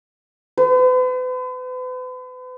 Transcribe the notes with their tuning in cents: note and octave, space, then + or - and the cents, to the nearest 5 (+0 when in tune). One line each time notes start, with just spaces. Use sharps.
B4 +45